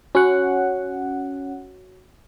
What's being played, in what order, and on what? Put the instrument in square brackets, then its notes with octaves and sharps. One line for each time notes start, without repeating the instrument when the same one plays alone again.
[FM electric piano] C#4 F#5 [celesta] F#4 C#5